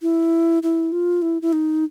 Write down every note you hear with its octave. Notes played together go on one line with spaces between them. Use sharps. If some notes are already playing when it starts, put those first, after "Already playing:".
E4
E4
F4
E4
E4
D#4